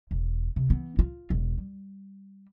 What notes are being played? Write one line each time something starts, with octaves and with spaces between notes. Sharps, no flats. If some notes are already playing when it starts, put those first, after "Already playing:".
E1
C3
E3 B3
F4
E1
G3